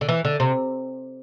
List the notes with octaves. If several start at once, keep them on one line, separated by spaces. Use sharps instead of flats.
D3
E3
D3
C3